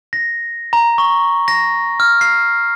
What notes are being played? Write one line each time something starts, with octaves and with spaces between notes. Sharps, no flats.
A#6
A#5
C#6
A#6
F6
C7